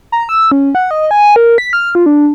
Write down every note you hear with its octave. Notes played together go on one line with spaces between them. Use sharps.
A#5
E6
C#4
F#5
D#5
G#5
A#4
B6
F6
F4
D4